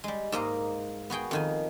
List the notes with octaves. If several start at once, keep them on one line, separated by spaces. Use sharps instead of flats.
G3 G#3
G#2 A#3 D#5 A#5
B3 F#4 G#4 G5
F2 D#3 G#5